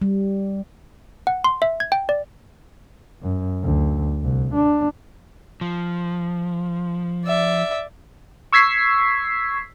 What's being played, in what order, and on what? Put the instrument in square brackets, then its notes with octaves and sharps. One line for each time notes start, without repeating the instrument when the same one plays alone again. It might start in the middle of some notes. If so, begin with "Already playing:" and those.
[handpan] G3
[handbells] F#5
C6
E5
G#6
G5
D5
[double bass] F#2
D2
C2
D4
[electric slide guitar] F3
[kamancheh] D5 E5
[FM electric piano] C#6 E6 G#6 B6 C7